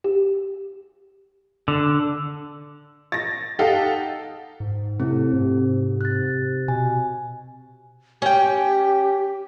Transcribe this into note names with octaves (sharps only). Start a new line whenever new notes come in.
G4
D3
A6 A#6
D#4 G4 A4 F5 F#5
G#2
A2 C3 C4 A4
G#2 C3
F#6 A6
B2 G#5
C#4 G4 G5